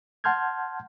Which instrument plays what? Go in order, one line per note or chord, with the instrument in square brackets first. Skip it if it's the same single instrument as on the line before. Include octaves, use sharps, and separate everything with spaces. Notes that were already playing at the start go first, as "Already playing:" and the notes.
[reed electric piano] F#5 A5 C6 F6 G6 G#6